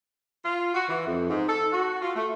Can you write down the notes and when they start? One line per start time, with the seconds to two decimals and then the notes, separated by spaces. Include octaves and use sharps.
0.45 F4
0.74 F#4
0.89 E3
1.06 F2
1.29 G#2
1.48 A4
1.72 F#4
2.02 F4
2.16 A3